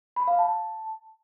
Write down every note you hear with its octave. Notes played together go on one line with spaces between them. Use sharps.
B5
F5
A5